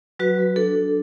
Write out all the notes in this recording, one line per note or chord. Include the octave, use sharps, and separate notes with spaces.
F#3 F#4 B4
F#3
D4 A4
D4